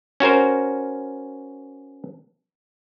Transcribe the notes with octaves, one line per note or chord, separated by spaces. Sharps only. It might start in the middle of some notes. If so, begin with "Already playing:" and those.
C#4 F#4 A#4 C5